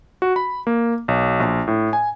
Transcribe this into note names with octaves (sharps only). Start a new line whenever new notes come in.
F#4
B5
A#3
B1
A#1
A2
G#5